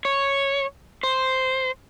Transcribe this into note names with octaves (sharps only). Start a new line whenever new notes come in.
C#5
C5